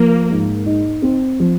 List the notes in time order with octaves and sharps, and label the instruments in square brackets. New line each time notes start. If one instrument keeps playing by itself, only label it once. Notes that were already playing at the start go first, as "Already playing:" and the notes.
Already playing: [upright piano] F3 [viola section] A#3
[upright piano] G#2
D#4
C4
F3